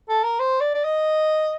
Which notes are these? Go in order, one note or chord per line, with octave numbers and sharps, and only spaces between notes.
A4
A#4
C5
D5
D5
D#5